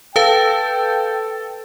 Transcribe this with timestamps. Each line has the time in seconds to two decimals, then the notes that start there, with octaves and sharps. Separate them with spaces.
0.16 A4 B4 F5 G5 A5